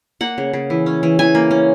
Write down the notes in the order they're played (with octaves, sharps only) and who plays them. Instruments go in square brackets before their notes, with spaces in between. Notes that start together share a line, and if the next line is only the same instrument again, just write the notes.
[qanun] A#3 F#5
C#3
C#3
E3
C#4
E3
E3 G#5
A#3
C#4